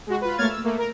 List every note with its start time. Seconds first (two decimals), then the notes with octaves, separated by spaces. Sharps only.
0.07 G#3 F#4
0.21 F4 B4
0.37 A3 A#3 C#5 F6 G#6 A6
0.50 E6
0.64 A3 A#3
0.78 A#4